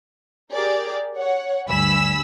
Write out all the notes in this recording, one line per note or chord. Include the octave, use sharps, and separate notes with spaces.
G4 G#4 A#4 D5
C#5 F#5
D2 G2 G#5 B5 E6 B6